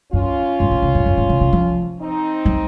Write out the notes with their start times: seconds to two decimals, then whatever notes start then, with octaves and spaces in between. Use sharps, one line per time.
0.12 F#2 C#4 F4
0.60 G#2
0.71 A#2
0.82 C3
0.95 F#2
1.06 F2
1.18 G#2
1.30 C#3
1.41 C#3
1.53 F3
1.99 C4 D#4
2.45 F#3